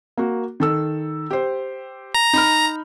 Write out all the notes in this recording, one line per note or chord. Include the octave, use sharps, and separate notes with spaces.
A#3 F#4
D#3 A4 E6
G4 C5
A#5
D#4 B5 F6